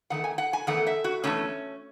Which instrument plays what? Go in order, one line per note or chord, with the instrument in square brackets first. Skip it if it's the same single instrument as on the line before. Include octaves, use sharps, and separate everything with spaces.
[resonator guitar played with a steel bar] E2 D#3 A3 F#5
G#5
F#5
G#5
E2 D#3 A3 F#5
E5
F#4
E2 D#3 A3 C#4